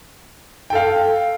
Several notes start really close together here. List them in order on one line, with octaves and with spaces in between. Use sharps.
G5 A4 F5